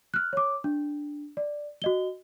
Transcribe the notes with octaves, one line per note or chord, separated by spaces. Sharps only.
F6 F#6
C#5 D6
D4
D5
F#4 D#5 G7